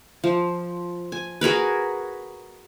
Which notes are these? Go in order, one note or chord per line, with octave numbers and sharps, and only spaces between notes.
F3
G#5
F#4 G#4 A#4 B4